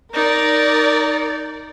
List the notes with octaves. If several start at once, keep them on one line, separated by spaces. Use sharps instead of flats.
D#4 A#4 D5